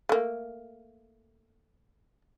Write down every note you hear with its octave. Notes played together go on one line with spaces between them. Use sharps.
A3 A#3